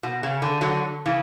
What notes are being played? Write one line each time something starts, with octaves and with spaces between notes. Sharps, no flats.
B2
C#3
D3
D3 F#3
C#3 E3